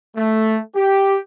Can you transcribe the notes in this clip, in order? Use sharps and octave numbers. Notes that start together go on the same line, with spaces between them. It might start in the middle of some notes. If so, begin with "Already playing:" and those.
A3
G4